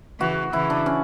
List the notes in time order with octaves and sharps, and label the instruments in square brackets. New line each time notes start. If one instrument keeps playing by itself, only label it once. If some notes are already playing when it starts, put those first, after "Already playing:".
[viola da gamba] C#3 E3 [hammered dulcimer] F#4
[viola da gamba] C#3 E3 [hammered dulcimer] E4
[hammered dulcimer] D4
C#4